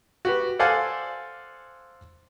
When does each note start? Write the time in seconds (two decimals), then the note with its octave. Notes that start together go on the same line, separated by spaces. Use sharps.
0.25 F#4 G4 B4
0.59 A4 C5 D5 F5 F#5 G#5